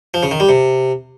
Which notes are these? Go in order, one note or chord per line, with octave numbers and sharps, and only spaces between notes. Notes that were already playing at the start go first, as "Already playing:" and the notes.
F3
C#3
D#3
G3
C3